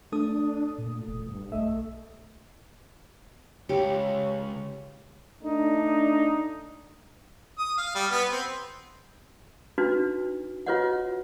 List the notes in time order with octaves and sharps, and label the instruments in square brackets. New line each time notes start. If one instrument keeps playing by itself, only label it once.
[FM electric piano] A3 A4 D#6 [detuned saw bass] D4
[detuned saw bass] A#2
E1
G2
[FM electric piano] B1 D#5 E5 [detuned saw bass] A3
[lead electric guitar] C#2 [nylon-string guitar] G4 [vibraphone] C#5
[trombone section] A3 D4 [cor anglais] D#4
[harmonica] D#6
F5
G3
B3
C4
[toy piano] D4 D#4 F#4 B4
F4 F#4 B4 C#5 D#5 F#5